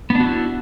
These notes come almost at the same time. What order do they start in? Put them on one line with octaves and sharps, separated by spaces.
B3 D4 F#4 E4